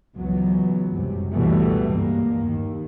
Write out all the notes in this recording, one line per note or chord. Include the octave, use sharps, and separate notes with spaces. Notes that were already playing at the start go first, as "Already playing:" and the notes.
C#2 E3 F#3 B3
G1 F#2 C3
C#2 B2 E3 G3 A3
G2 A#3
D#2 D#3